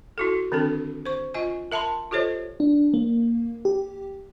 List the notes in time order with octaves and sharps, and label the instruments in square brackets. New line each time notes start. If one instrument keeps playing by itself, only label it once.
[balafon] E4 F#4 A4
D3 D#3 C4 D4 A4
C5 C#6
F4 D#5 G#5 C#6
A#4 E5 A5 B5 C6
F4 G4 A4 C5 C#5 D#5
[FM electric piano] D4
A#3
G4